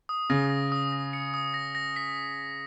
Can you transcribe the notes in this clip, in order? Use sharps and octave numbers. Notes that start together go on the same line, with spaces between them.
D#6
C#3 A#6
A#6
D#6
A#6
C#7
D#6
A#6
A#6
B6